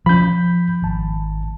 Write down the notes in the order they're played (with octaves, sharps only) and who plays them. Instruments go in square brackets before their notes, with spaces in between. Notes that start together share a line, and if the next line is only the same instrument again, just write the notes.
[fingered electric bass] F3 C#4 [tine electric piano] B5 G6
[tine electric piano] G#1 A5